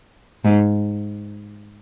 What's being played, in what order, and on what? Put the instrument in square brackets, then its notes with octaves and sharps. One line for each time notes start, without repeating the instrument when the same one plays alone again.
[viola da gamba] G#2